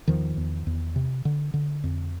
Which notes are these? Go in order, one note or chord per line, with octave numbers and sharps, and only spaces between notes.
E2 D#3 F3
E2
E2
C3
D3
D3
F2